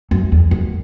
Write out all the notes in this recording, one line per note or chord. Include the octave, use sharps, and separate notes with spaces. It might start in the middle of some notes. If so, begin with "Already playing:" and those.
F#2
E2
F#2